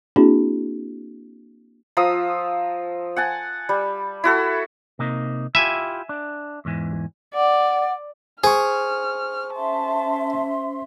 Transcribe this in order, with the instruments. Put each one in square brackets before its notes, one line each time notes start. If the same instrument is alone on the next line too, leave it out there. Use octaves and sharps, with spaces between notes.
[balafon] A#3 C4 D4 E4 F#4 G#4
[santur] F3 A#5 D#6 E6
F#5 G#5 A5
G3
E4 F#4 A4
[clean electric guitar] C3 A#3 D#4
[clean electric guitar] E4 F4 G4 [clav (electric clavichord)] E5 G#5
[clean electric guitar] D4
E2 G#2 E3
[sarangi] D5 [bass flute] F#5
[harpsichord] G#4 [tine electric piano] C5 C#6 [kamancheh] F6
[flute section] C#4 E5 C6 [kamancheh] A5